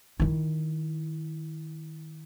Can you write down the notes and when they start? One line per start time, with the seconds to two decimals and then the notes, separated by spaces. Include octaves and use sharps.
0.20 D#3 E4